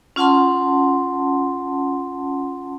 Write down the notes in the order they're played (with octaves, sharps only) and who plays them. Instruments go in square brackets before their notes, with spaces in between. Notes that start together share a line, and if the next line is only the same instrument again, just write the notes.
[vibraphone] C#4 F4 F#5 A5 C6